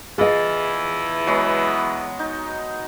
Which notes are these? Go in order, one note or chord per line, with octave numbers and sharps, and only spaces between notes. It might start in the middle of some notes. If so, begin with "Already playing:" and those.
E2 E3 F4 G#4 D#5
F#3 G#3 B3
D#4